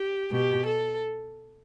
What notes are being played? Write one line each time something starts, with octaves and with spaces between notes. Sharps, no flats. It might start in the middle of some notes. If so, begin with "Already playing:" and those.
Already playing: G4
B2 G4
A4